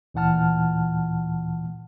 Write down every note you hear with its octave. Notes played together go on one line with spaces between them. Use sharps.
D2 A#2 E3 F#5 A5 F6